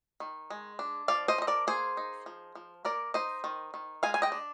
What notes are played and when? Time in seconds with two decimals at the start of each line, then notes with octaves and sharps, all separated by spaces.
0.20 D#3
0.50 G#3
0.79 D4
1.08 F3 D5 F5
1.28 C5 D#5
1.38 F3 D#5
1.47 A#4 D5
1.67 A#3 G#4 C5
1.97 D#4
2.26 F3
2.55 F3
2.85 A#3 A#4 D5
3.14 D#4 C5 D#5
3.44 D#3
3.74 D#3
4.03 G#3 F5 G#5
4.14 G#5
4.22 D#5 G5
4.32 D4